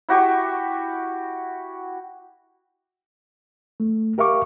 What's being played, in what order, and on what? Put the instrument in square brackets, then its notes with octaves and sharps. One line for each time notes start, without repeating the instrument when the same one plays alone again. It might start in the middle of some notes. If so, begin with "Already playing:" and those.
[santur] E4 F#4 G4 C#6
[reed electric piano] A3
G4 A#4 E5 F5 C#6 D6